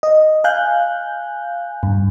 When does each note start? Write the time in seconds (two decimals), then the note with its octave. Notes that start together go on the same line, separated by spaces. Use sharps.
0.03 D#5
0.44 F5 G#5 F#6 G6
1.83 G2